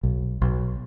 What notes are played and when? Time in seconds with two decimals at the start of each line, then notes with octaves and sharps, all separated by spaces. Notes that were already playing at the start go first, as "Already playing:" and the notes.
0.03 B1
0.42 B1